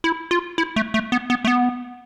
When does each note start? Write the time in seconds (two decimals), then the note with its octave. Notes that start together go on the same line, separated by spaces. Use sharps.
0.04 E4
0.31 F4
0.58 E4
0.76 A3
0.94 A3
1.12 B3
1.30 B3
1.45 A3
1.47 B3